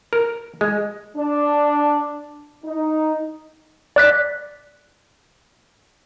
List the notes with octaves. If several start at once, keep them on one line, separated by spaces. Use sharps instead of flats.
A#4
G#3
D4
D#4
D5 F#6 B6